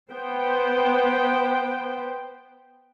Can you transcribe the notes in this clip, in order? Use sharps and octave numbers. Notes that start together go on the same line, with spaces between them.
B3 C5 G5